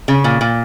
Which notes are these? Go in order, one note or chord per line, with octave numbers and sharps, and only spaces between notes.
C#3
A#2
A#2